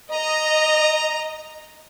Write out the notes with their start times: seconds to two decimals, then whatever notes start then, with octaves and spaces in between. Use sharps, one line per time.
0.12 D#5 A#5